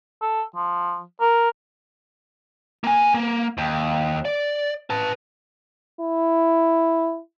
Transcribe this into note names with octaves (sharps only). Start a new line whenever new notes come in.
A4
F3
A#4
A#3 G#5
A#3
D#2
D5
B4 A5
E4